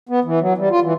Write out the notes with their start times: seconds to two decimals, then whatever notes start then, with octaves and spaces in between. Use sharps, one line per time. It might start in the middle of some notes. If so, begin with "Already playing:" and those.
0.09 B3
0.24 E3
0.40 F#3
0.58 G3
0.70 F4
0.83 E3